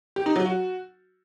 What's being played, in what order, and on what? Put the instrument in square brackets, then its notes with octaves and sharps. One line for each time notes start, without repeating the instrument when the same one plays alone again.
[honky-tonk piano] G4
D#4
F#3
F#4